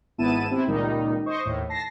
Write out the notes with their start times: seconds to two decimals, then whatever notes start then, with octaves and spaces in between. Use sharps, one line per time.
0.18 G#1 B3 E4 A5 D#7 E7
0.50 C3 C4 E4
0.67 C#2 A#2 D#3 G3 D#4
1.26 C5 D#5 C#6
1.45 D#2 A2
1.69 A5 A#6 C7